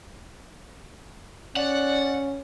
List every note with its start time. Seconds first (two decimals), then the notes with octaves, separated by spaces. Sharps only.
1.56 C#4 D5 F#5